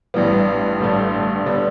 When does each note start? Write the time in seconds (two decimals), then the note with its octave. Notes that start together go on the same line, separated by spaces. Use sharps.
0.14 A1 G2 E3 G3 B3
0.80 A1 G2 D3 A3
1.46 D3 G3 B3